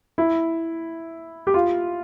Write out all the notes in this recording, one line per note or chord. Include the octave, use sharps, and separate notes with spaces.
E4
G4
F4